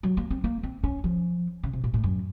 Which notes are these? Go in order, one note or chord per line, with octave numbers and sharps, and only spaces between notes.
F#3
A#3
C4
A#3
C4
C#4
F3
C#3
C3
A#2
A2
F#2